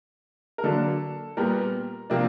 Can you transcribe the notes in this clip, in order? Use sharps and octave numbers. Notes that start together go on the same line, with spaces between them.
A#4
D3 F#3 A#3 D4 A4
A#2 G3 B3 A#4
C3 F3 A#3 D4